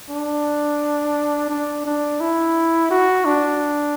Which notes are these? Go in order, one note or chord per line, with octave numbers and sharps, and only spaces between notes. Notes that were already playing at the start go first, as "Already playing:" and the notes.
D4
D4
D4
E4
F#4
D4